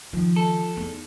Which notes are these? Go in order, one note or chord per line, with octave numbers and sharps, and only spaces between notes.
D#3 F3
A4
E2 D#4